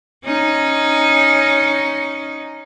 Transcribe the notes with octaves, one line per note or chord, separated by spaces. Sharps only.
C#4 D#4